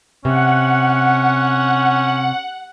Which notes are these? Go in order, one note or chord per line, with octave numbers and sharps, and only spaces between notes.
C3 C#4 F#5